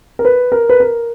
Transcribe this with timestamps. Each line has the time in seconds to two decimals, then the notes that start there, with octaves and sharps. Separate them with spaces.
0.19 A#4
0.25 B4
0.52 A#4
0.69 B4
0.80 A#4